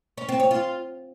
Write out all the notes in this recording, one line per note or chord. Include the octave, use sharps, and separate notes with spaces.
C#4
C4
C#5
F4